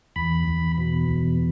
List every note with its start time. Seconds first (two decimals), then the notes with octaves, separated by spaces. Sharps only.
0.16 E2 B5
0.48 E2
0.78 B2
1.09 E2